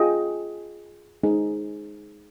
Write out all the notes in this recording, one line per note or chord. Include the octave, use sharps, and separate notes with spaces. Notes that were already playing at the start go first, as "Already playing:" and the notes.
Already playing: F4 G#4 D#5 G5
G#3 D#4 G#4 C5